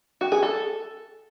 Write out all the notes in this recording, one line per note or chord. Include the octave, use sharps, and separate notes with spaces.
F#4
G#4
A4